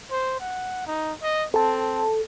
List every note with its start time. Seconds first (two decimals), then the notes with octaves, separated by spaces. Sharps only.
0.11 C5
0.40 F#5
0.86 D#4
1.22 D#5
1.54 C4 A4 A5